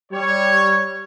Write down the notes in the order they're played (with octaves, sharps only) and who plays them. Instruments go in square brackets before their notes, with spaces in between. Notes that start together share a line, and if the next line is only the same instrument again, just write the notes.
[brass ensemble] G3 C#5